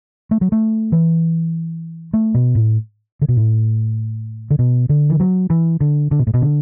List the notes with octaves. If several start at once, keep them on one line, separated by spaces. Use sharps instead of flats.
A3
F#3
A3
E3
A3
B2
A2
D3
B2
A2
D3
B2
D3
E3
F#3
E3
D3
D3
B2
A2
B2
D3